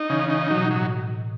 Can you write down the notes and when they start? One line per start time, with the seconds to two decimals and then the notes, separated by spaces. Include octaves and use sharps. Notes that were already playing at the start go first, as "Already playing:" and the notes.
Already playing: D#4
0.10 C#3 E3
0.30 D#4
0.50 B2 F#3
0.70 A2 F#3